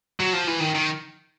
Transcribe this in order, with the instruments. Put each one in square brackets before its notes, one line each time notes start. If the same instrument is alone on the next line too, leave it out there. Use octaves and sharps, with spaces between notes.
[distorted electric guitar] F#3
F3
E3
D#3
D#3